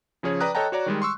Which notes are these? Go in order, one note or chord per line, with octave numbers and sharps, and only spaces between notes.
C#3 F3 C#4 G#4 C#5
B4 D5 G5 A#5 D#6 F#6
A4 C#5 D#5 G5 A5 A#5
F#4 C#5 D5 A#5
D#3 G3 G#3
C6 C#6 E6